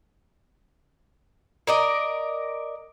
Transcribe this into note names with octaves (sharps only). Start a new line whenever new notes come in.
A#4 D5 D#5